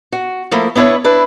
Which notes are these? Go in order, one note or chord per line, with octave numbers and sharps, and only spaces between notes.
F#4
F3 A3 A#3 E4
B3 D4 E4 B4 C#5
D4 E4 B4